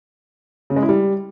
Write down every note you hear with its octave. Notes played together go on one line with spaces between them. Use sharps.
C#3
G#3
E4
G3